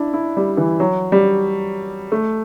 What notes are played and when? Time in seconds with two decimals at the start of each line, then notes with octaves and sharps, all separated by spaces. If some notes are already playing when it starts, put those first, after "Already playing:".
Already playing: D4 E4
0.14 E4
0.37 G3
0.57 E3
0.80 F#3
1.12 G3
2.12 A3